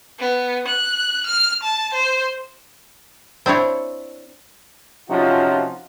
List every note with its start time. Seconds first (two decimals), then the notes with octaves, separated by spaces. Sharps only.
0.19 B3
0.68 F#6
1.26 F6
1.63 A5
1.94 C5
3.46 C4 D4 E4 C#5
5.10 C3 F3 C#4 D#4 F4 F#4